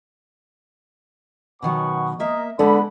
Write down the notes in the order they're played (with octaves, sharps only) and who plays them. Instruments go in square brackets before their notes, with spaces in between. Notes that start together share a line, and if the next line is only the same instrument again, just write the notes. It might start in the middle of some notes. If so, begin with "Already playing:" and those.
[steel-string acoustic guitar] B2 D#3 F#3 [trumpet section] B3 C#4 C#6
[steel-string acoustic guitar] A#3 E5 [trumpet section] A#4 D#5
[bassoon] D3 [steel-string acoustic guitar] G#3 B3 [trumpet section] B5